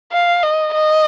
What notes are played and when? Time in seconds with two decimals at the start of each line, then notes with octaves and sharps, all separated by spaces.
0.12 F5
0.43 D#5
0.74 D#5